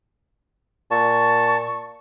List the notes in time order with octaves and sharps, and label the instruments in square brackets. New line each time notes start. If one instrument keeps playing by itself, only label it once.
[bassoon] A#2 [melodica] A5 [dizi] C#6